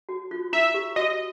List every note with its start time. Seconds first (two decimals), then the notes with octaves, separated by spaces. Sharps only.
0.09 F#4
0.31 F4
0.53 E4 E5
0.74 G4
0.96 F#4 D#5